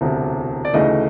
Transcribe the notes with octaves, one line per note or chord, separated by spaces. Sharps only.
E1 D2 C3
D5
D2 C#3 E3 A3 D#4 D#5